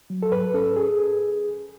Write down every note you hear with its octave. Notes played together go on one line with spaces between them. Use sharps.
F#3
A4
G#2 B4
C#4 A4
G#4